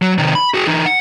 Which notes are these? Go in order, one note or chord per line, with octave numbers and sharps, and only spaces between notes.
F#3
C3 D#3
B5
F#4 G#4
E3 D#4
F#5